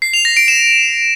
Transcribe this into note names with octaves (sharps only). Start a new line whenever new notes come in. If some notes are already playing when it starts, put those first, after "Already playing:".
C7
F7
A#6
D7
E7